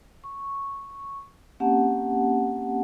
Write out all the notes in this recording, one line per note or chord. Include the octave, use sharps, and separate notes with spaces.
C#6
A#3 C4 C#4 G4 F#5 A5